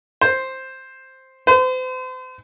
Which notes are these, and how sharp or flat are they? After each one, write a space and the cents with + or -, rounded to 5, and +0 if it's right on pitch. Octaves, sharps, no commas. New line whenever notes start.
C5 +5
C5 -40